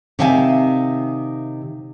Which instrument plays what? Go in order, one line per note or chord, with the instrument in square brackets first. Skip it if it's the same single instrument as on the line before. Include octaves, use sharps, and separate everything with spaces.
[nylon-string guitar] C3 D#3 E5 F5 G#5